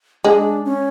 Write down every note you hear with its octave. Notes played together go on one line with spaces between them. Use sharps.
G#3 D4
C#4